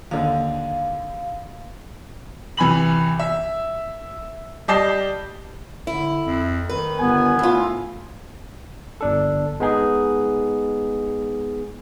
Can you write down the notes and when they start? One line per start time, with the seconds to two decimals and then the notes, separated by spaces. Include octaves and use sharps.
0.11 D#2 D3 F5
2.57 C2 E3 G#5 B5 F#7
3.19 E5
4.68 G3 G4 D#5 A5 C7
5.87 D3 E4
6.24 F2
6.69 D#3 B4
6.99 G1 B3 G#5
7.39 A2 E4 F4
9.01 G1 D4 A4
9.60 G#3 B3 D#4 G#4